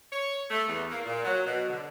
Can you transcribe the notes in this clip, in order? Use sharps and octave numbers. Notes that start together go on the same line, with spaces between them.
C#5
A3
E2
A#3
A#2
F#3
B2
D3